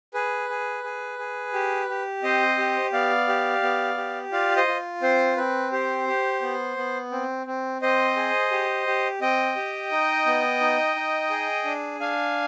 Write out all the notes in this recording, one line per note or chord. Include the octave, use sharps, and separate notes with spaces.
G#4 B4
G#4
G#4
G#4
G4
G4
C4 C5 D#5
G4
B3 D5 F5
G4
B3
G4
F4 D5 F5
C5 D#5
F4
C4 C5
C4 B4
G4 C5
G4
B3
B3
C4
C4
C4 C5 D#5
G#4
G4
G4
C4 D#5 G5
G4
D#4
B3
D#4
D#4
G#4
D4
D4 F5 G#5